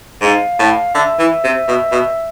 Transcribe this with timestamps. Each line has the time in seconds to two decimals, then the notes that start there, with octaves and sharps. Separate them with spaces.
0.21 G#2 F5
0.59 A2
0.95 D3 E5
1.19 E3
1.44 C3
1.68 B2
1.92 B2